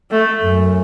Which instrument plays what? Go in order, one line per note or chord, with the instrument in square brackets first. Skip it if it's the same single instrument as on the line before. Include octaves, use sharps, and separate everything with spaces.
[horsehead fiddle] A3
[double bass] F#2